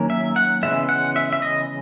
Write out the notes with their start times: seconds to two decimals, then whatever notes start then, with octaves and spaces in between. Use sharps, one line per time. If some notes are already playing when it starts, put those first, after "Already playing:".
Already playing: D#3 F#3 A#3 C#4
0.10 E5
0.36 F#5
0.63 C#3 E3 G#3 B3 E5
0.89 F#5
1.16 E5
1.33 E5
1.42 D#5